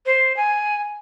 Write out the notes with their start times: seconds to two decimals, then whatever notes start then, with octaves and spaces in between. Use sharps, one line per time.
0.06 C5
0.36 G#5